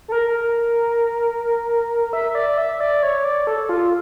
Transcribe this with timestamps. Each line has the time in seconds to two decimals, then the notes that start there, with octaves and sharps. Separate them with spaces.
0.08 A4
0.12 A#4
2.13 E5
2.35 D5
2.58 E5
2.80 D5
3.03 C#5
3.24 D5
3.47 A4
3.69 F4